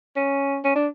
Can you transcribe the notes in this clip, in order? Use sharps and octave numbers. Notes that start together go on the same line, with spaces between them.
C#4
C#4
D4